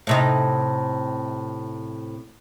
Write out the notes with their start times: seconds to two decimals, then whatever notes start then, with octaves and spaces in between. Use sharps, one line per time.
0.07 A2 C3 D#4